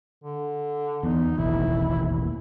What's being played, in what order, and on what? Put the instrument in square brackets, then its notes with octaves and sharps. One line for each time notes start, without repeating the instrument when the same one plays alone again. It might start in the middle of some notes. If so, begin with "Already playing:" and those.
[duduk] D3
[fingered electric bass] E2 [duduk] D#4
[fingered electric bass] E1 A1 D#2 [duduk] E4